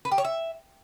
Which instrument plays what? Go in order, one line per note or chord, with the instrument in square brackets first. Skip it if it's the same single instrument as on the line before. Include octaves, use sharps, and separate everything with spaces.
[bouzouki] B4
G4
C#5
E5